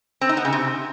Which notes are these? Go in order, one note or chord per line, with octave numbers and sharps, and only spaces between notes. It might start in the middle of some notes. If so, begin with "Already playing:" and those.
C4
D#4
B3
C#3
C3